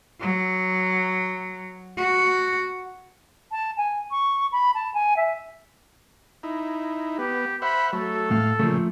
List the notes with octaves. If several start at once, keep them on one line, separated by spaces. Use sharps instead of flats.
F#3
F#4
A5
G#5
C#6
B5
A5
G#5
E5
D#4 E4
B3 G4
C5 E5 F#5 B5
F#3 A3 A4
A2 F5
A#2 C#3 F3 A3